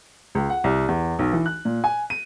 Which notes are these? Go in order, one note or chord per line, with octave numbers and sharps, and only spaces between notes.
C#2
F#5
C2
E2
B1
E3
F#6
A#2
G#5
D#7